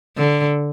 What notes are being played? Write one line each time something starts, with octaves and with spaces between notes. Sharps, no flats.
D3